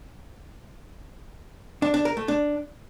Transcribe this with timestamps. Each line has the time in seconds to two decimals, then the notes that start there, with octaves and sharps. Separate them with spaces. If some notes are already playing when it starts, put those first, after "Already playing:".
1.82 D4
1.94 D4
2.05 A#4
2.17 A3
2.28 D4